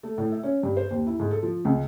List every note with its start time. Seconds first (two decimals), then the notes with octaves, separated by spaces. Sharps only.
0.03 A3
0.18 A2
0.32 E5
0.43 C#4
0.63 G2
0.77 C5
0.90 D#2
1.07 E4
1.20 G#2
1.31 A4
1.43 F3
1.65 C#2